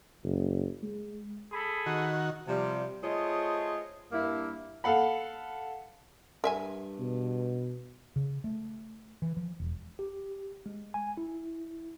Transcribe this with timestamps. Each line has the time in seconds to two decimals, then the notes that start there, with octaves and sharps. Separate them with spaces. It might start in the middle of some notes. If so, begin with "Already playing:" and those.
0.24 F#1
0.83 G#3
1.52 G#4 A4 B5
1.86 D#3 F#4
2.47 C3 F3 G3
3.04 A3 F4 G#4 C5 C#5 D#5
4.12 G2 A#3 E4
4.84 A4 F5 F#5 B5
6.44 G2 A#4 E5 G#5
6.99 B2
8.16 C#3
8.44 A3
9.22 E3
9.37 F3
9.60 E1
9.99 G4
10.66 G#3
10.94 G#5
11.17 E4